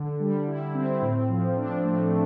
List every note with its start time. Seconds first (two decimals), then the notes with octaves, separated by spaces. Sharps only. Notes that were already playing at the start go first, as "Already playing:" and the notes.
Already playing: D3
0.20 G3
0.47 E4
0.74 C4
1.02 A2
1.29 F3
1.57 D4
1.84 A3